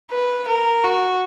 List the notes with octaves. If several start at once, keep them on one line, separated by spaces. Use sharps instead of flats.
B4
A#4
F#4